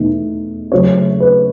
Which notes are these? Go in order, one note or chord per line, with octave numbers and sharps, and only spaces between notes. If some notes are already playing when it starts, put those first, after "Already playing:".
Already playing: E2 B2 A3 D#4
F#2 C#3 F#3 A3 C#4 C#5
B4